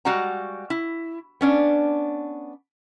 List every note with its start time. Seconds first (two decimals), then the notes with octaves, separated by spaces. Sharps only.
0.05 G3 G#3 F#4 F5 F#5 A#5
0.70 E4
1.41 B3 C#4 D4